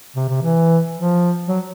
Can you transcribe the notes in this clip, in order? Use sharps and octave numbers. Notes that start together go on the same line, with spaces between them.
C3
C3
E3
F3
F#3